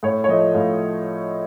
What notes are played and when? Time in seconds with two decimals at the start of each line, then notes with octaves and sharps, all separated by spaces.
0.03 A2 C#5
0.24 C#5
0.28 F3 A3 D#5
0.54 A2 F5